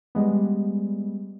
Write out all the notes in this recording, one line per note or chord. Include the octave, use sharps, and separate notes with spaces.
G3 G#3 B3